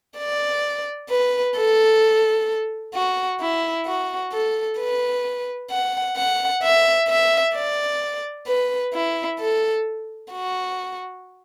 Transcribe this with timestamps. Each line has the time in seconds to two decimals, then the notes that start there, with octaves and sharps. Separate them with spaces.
0.18 D5
1.10 B4
1.57 A4
2.94 F#4
3.40 E4
3.86 F#4
4.33 A4
4.78 B4
5.71 F#5
6.17 F#5
6.62 E5
7.08 E5
7.55 D5
8.47 B4
8.93 E4
9.39 A4
10.32 F#4